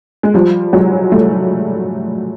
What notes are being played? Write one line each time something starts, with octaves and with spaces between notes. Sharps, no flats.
G#3
F3 G3
F#3 G#3
G3 A3